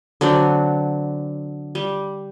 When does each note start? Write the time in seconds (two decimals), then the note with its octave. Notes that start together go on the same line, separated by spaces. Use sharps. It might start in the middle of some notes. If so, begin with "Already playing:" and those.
0.21 D3 F#3 C4 D4
1.75 G3